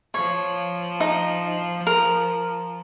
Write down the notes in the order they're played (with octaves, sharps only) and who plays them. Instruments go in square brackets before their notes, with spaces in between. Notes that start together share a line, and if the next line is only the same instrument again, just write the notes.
[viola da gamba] F3 [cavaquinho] C#5
[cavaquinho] D#4
A#4